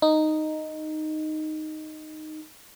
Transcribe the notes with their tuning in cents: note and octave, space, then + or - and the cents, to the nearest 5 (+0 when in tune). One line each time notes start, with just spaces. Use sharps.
D#4 -5